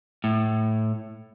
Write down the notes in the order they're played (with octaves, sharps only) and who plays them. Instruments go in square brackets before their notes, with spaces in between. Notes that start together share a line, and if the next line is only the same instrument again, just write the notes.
[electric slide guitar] A2